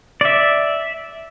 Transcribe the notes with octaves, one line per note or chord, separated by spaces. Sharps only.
D5 E5